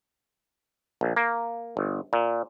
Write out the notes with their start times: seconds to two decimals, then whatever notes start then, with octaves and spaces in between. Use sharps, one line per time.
1.01 A#1
1.16 A#3
1.77 G1
2.13 A#2